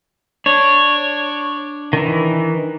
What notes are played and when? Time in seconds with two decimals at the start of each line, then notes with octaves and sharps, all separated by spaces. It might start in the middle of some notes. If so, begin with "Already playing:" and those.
0.46 D4 C#5
1.93 D#3 E3